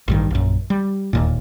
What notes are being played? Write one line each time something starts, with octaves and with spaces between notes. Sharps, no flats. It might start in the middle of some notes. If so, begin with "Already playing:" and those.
A1 G2 D#3
A#1 F#2
G3
E1 D#2 A#2